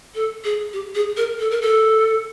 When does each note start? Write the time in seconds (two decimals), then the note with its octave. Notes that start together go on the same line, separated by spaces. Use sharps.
0.15 A4
0.44 G#4
0.73 G4
0.95 G#4
1.17 A#4
1.39 A4
1.51 A#4
1.61 A4